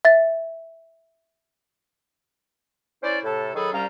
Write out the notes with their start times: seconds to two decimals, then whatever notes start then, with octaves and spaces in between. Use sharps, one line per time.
0.05 E5 A6
3.02 C#4 E4 C5 D5
3.24 A2 C3 A4
3.55 D#3 F#3 G#4 A4 B5
3.72 C2 G3 C#4 F5 A#5